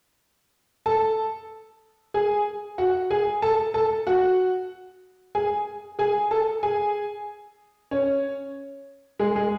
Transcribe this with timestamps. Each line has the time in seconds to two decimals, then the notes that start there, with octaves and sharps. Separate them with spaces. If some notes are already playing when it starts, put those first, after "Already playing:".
0.86 A4 A5
2.14 G#4 G#5
2.78 F#4 F#5
3.10 G#4 G#5
3.42 A4 A5
3.74 A4 A5
4.07 F#4 F#5
5.35 G#4 G#5
5.99 G#4 G#5
6.31 A4 A5
6.63 G#4 G#5
7.91 C#4 C#5
9.19 G#3 G#4
9.36 G#3 G#4